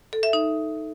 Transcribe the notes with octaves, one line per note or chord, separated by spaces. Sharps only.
A4
E5
D#4